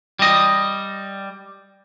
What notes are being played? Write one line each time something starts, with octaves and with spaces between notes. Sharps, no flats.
G3 D#5